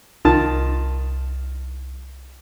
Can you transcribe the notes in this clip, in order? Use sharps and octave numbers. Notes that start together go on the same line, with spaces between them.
C2 D#3 F4 A5